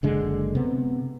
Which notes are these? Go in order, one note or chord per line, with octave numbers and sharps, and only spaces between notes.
F#1 D3 G#3
C3 B3